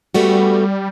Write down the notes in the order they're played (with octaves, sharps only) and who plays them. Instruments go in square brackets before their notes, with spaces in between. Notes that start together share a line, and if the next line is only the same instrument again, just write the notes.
[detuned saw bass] G3 [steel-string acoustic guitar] A3 B3 F#4